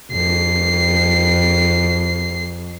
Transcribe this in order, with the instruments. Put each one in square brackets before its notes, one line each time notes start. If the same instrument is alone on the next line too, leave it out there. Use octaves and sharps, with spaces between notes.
[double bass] F2 [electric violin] C7